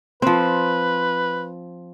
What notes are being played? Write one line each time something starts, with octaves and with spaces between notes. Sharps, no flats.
F3 C4 B4